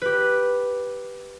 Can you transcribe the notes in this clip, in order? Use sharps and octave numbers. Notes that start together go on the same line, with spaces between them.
G4 B4